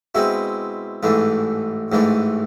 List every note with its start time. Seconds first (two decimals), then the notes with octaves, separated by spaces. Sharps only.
0.15 B2 G#3 C4 E4
1.03 A1 G#2 E3 A3 D4
1.92 A1 G#2 E3 A3 D4